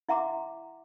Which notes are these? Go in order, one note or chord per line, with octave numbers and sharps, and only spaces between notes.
E4 E5 F#5 A#5 C6 D6